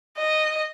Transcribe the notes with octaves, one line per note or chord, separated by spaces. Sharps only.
D#5